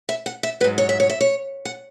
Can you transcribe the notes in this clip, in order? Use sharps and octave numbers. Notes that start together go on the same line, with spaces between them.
E5
F#5
E5
G#2 F#3 B4
C#5
E5
C#5
E5
C#5
F#5